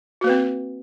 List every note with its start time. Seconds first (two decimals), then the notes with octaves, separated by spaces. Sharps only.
0.21 F#4
0.24 A#3
0.27 B4
0.30 C4